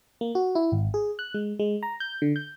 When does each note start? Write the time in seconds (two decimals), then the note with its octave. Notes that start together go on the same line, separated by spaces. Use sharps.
0.21 A#3
0.35 F#4
0.55 E4
0.72 G#1
0.94 G#4
1.19 F#6
1.34 G#3
1.59 G#3
1.83 A#5
2.00 G6
2.22 D3
2.36 G6